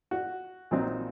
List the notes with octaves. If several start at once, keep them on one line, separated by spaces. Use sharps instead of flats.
F#4
A#1 A#2 F#3 C4 D#4